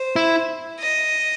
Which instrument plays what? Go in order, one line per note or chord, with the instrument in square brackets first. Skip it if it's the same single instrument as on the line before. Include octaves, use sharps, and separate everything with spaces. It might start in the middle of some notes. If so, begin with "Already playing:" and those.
Already playing: [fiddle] C5
[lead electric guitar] E4
[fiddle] D#5